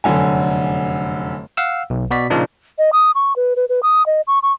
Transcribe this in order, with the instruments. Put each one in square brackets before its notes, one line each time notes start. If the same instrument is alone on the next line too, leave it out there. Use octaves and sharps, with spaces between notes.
[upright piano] F1 F#2 D3 G#5
[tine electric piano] F5 F#5 E6
B1
B2 F#4 D5 B6
A#2 C#3 F3 A#3 D4 D#4
[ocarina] D#5
D#6
C#6
B4
B4
B4
D#6
D#5
C#6
C#6